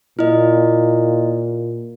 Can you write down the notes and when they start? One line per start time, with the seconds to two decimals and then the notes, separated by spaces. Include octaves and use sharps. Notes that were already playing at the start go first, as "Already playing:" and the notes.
0.19 A#2 E4 D#5